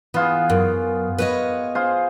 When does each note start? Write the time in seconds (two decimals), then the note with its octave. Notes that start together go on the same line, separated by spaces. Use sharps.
0.14 E3 B3 F4 G#4
0.50 F#2
1.18 B4 C#5 D#5
1.75 F4 G#4 C5